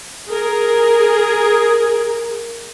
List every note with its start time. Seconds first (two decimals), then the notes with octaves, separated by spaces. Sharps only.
0.29 G#4 A#4